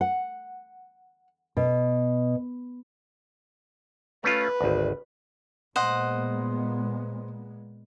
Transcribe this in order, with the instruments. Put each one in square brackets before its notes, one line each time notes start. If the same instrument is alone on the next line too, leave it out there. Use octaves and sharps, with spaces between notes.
[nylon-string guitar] F#5
B2
[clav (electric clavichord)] A3 C#4 F4 [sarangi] B4
[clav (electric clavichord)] G#1 D2
[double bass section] A#2 G#3 B3 [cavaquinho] C5 D#5 F#5